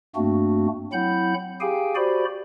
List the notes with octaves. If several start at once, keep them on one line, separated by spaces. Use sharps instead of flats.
G2 A3 A#3 C4 D4 F#4
F#3 C4 E4 F#5 B5 G6
G4 G#4 F5 G5 G#5
F#4 G4 C5 D5 B5